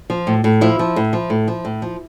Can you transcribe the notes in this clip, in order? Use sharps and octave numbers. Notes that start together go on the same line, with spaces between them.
F3
A2
A2
F3 E4
F3
A2
F3
A2
F3
A2
F3